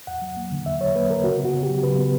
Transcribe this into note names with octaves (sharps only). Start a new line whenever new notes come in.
E2 F#5
F#3
A#3
D3
E2 E5
F#3 C#5
A#3 B4
D3 A#4
C#3 F#4
B3
F#4
C#3
G4
F#3
C#3 B4
B3